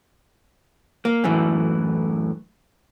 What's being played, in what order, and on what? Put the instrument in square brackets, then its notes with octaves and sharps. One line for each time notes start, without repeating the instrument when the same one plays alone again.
[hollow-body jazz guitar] A#3
F#2 A2 E3